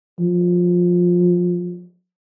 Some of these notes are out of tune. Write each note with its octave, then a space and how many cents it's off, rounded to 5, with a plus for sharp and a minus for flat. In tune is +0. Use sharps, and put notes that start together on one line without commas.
F3 +20